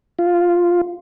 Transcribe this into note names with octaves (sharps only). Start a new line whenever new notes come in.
F4